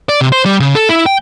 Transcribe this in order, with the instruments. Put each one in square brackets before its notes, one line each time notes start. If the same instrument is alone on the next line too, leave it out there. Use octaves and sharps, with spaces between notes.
[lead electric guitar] D5
C3
C5
G3
C#3
A4
E4
G5